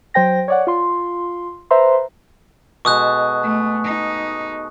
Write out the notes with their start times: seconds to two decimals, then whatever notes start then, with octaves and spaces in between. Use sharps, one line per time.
0.14 F#3 C5 G5 A#6
0.48 C#5 D5 F#5
0.67 F4 C6
1.71 B4 C5 E5 A#5 C6
2.85 B2 G#3 A4 C#6 D#6 F#6
3.43 A3
3.85 D#4